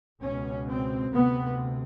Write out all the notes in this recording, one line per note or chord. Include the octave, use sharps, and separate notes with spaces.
C#2 B2 C#4
C4
D2 C3 B3